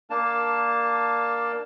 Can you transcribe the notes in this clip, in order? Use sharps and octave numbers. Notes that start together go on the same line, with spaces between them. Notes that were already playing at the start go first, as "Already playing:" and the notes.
A#3 D4 A5